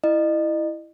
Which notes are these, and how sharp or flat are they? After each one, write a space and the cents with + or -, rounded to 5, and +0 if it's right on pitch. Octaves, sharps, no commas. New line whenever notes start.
E4 +0 D#5 -35